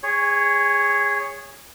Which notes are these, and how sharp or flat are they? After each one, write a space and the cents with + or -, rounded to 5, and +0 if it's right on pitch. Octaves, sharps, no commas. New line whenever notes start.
G#4 -20 C#5 +0